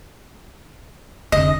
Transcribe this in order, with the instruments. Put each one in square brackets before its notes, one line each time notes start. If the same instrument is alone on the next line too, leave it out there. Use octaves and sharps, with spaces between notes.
[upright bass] F1 D3 [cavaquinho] D#5